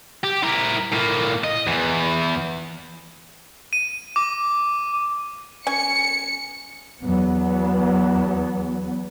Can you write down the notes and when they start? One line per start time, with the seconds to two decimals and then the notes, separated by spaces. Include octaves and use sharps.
0.24 G4
0.43 E4 A#4
0.93 A2 A#3
1.44 D#5
1.67 E2 E3
3.73 D#7
4.16 D6
5.67 C#4 G#5 C#7
7.03 E2 F#3 B3